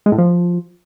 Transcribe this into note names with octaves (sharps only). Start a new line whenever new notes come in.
G#3
A2
F3